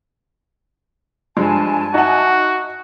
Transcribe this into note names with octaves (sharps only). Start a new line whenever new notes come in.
G2 F3 G#3 G#5 A5
D#4 F#4 E5 F#5